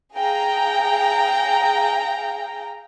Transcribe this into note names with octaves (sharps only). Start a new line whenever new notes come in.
G#4 F5 G5 A#5